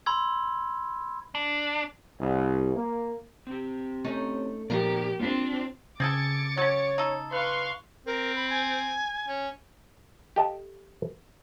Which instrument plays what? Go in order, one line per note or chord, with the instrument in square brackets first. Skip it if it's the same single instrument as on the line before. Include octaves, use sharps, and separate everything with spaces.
[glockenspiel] B5 C6 E6 G#6
[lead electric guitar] D4
[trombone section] C2
A#3
[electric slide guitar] C4 G4
[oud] A3 C#4 D#4
[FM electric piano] A#2 F3 [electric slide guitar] B3 D#4 D5 [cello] G4 [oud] A#4
[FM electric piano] A#3 [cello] C4 D4 [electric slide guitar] F4
[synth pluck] C#3 G#6 [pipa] C4 G#4 A4 [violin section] D6 A6 C#7
[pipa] F#3 C#4 [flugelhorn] C#5
[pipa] D#4 A4
[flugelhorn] B4 [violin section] F5 C6 C#6 [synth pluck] F#6
[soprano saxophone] C4 [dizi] A#4
[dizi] B5
G#5
[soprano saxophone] C#4
[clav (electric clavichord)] G4 A4 D#5 F5 G5 A5